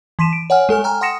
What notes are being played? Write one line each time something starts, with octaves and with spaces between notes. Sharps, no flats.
E3 C6 B6 D#7 E7
D7
C#5 F#5 G#5 F6
G#3 A4 G#5 F6
G5 G#5 A#5 F6
F#5 C6 D#6 A#6 C#7 E7